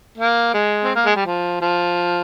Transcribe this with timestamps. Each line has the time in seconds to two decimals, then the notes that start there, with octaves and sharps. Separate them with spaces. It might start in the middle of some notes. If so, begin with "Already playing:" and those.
0.18 A#3
0.54 G#3
0.84 C4
0.95 A#3
1.05 G#3
1.15 G3
1.25 F3
1.61 F3